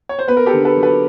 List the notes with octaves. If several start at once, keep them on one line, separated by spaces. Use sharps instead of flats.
C#5
C5
B3 B4
A#4
G4 A4
D3
A4 B4
F#3
A4 B4